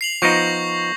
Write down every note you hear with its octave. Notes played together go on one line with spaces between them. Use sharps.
C7 F7 F#7
F3 B3 D#4 C#6 G6 A#6